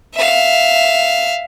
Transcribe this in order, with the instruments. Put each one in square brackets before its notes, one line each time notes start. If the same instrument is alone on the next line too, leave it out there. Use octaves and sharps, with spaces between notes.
[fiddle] E5 F5